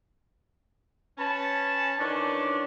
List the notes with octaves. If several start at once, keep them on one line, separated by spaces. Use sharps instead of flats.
C#4 B4 A5
D#3 E3 C#4 D4